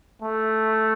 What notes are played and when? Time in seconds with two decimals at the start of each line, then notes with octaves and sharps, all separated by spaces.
0.22 A3